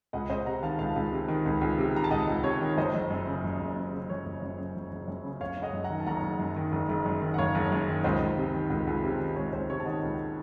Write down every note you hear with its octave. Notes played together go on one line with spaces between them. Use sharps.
C#2 D#5 F#5
C#2 C5 D#5
C3 F#5 A#5
D#3 F5 A5
C#2 F5 A5
C#2
C3
D#3
C#2
C#2
C3
D#3 A#5
A5
C#2 D#5 F#5
C#2
C3 C#5
D#3
F#1 C5 D#5
F#1
F#2
C#3
F#1
F#1
F#2
C#3
F#1 C#5
F#1
F#2
C#3
F#1
F#1
F#2
C#3
F#1 C#5 F5
F#1
D#5 F#5
F#2
F#5 A#5
D#3
A5
F#1 F#5 A#5
F#1
F#2
D#3
F#1
F#1
F#2
D#3
F#5
F#1 C#5 F5
F#1
F#2
D#3
C#2 C5 D#5
C#2
C3
D#3
C#2
C#2
C3
D#3
C#2 C#5
C#2 C5
C3 C#5
A5
D#3 D#5 F#5
C#2